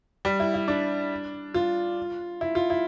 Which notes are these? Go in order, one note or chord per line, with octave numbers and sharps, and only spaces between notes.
G3
E4
E4
D4
F4
E4
F4
E4